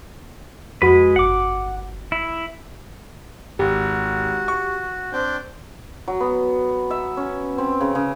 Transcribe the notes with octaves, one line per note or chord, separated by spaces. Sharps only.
F2 G#3 F#4 B4 B5
G1 F#5 D6
E4
G#1 F#4 G4
C#6
C4 D4 G5
F#3
B3
E5
C#4
C4
C#3
C#3